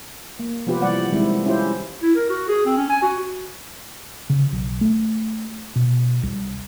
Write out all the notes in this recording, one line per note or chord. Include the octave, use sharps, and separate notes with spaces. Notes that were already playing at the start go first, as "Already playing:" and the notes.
A#3
C3 F3 B3 F4 G4 B4
E3 G3 D5 F#5
D#3 G3 G#3 C4 E4
C#4 E4 F4 G4 C5
E4
A#4
F#4
G#4
C4
C#4
G#5
F#4
C#3
B1
A3
B2
C2